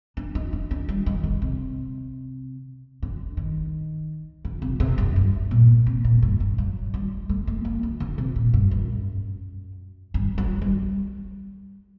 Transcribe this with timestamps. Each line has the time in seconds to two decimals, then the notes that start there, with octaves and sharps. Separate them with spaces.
0.17 D4
0.35 D#4
0.53 D4
0.71 D4
0.89 G3
1.06 D#3
1.24 D3
1.42 C3
3.03 D3
3.37 D#3
4.45 D3
4.62 C3
4.80 C3
4.98 F#2
5.16 G2
5.51 A#2
5.87 C3
6.04 A#2
6.22 G2
6.40 G2
6.58 F#3
6.94 G3
7.29 A3
7.47 A#3
7.65 A#3
7.83 D3
8.00 D3
8.18 C3
8.36 A#2
8.54 G2
8.71 F#2
10.14 G2
10.38 F#3
10.62 G3